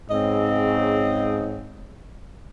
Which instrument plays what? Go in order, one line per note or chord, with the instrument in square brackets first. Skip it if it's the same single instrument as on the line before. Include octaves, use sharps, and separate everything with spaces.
[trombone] G#2 [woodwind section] C#3 C4 [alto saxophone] D#5